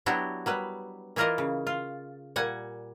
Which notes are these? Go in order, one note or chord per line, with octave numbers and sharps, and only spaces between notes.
F#3 B3 D4 E4 F#4 G4
F#3 G3 B4
E3 E4 F4 A#4 D5 D#5
C#3
F4
A#2 G3 F#5 G#5